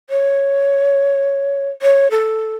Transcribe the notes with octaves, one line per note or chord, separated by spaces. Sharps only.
C#5
C#5
A4